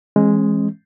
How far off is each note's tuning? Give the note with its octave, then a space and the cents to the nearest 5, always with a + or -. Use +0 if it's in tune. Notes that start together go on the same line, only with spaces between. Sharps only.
E3 +0 G#3 +0 C#4 -45